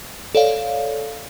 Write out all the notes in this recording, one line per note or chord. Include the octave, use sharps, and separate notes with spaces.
A4 C#5 D5 F5